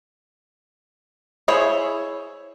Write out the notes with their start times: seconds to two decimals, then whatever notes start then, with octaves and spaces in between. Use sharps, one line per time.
1.48 E4 G#4 C5 C#5